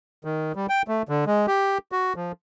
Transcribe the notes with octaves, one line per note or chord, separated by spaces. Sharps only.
D#3
G3
G5
A3
D3
G#3
G4
F#4
F3